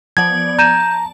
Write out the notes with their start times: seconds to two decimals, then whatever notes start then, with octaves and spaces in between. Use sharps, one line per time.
0.17 F3 B3 D5 G#6
0.59 A5 A#5 G6 D#7 E7